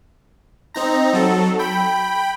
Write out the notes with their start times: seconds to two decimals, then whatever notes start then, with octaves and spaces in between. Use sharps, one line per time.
0.74 C4 D#4 A#5
1.13 F#3 A4
1.59 G5 B5